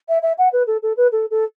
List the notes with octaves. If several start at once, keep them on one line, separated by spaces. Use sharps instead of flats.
E5
E5
F#5
B4
A4
A4
B4
A4
A4